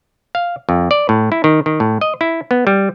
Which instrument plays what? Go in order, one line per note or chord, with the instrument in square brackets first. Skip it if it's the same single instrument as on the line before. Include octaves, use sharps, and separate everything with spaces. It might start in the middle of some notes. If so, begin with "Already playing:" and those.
[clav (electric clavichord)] F5
F2
D5
A2
E4
D#3
D#3
A2
D#5
E4
B3
G3